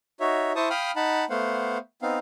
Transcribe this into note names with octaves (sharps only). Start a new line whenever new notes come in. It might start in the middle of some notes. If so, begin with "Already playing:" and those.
D#4 F#4 C#5 E5
E4 C5 A5 C#6 D#6
F5 G5 B5 D#6 F6
D#4 F#5 A5 B5
A3 B3 C5 F5 F#5
B3 C4 D#4 F5